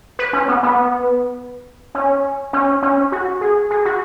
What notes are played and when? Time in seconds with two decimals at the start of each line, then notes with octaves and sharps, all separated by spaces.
0.19 B4
0.33 C#4
0.48 B3
0.63 B3
1.95 C#4
2.53 C#4
2.82 C#4
3.12 F#4
3.41 G#4
3.71 G#4
3.85 F#4